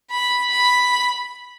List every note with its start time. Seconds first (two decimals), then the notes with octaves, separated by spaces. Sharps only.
0.11 B5
0.50 B5